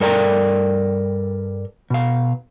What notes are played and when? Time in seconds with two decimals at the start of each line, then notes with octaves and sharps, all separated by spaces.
0.01 G2 A4 A#4 D5 G5 A#5
1.90 B2 F5